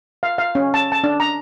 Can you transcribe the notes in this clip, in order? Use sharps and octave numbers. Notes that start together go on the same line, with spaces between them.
F5
F5
C#4
A5
A5
D4
A#5